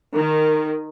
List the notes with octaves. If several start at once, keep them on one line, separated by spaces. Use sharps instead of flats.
D#3